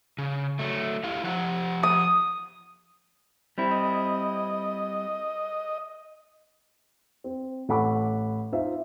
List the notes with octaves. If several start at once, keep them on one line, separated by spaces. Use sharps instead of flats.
C#3
F#3 A3
E4 G4 F5
F3 G4 F#5
D#6
G3 C4 E4
D#5
C4
A1 A4 F#5 B5 C#6 D6
D#4 F4 C5 E5